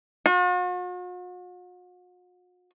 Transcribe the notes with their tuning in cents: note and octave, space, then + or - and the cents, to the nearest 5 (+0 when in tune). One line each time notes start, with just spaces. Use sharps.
F#4 -45